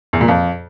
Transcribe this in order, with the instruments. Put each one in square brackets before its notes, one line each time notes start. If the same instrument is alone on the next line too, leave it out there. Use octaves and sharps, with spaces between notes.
[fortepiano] E2
A#2
F2